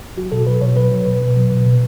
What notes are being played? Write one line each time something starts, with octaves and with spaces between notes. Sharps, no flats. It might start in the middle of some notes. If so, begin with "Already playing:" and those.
F#3 F#4
B2 A4
F#3 B4
B2 C#5
F#3 B4
F#3
B2
B2
F#3
B2
B2